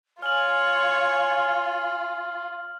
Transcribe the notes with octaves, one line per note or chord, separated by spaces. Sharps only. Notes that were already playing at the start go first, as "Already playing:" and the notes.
F4 C#5 G#5 F6 F#7